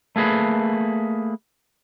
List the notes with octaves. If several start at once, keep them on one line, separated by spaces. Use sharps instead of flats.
A3 A#3 G#4 B4